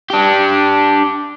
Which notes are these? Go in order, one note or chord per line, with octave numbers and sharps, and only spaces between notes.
D4 G4